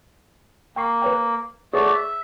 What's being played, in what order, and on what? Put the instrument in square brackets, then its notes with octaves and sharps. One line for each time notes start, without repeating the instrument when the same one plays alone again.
[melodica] A#3 [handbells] G5 C#6 C7
[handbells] B4 C#5 G5
[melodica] A3 F#4 D5 [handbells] G#4 B4 C#5
[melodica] E5